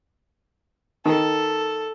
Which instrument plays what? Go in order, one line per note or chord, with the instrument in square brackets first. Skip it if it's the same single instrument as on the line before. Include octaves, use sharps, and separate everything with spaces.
[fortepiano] D#3 [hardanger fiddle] A4